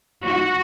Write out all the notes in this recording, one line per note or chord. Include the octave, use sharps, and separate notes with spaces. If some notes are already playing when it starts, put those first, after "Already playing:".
F#4